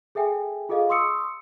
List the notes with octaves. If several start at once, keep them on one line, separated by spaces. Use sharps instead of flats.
G#4 A4 E5 G5 G#5
F4 G#4 A4 D#5 F5
C6 C#6 D#6 E6 C#7